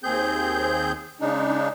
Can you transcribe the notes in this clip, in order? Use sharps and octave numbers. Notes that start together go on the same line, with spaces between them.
D#2 C4 G#4 G6
C#3 G#3 D4 D#4